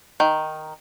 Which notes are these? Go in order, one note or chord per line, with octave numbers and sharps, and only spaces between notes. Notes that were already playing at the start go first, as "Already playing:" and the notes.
D#3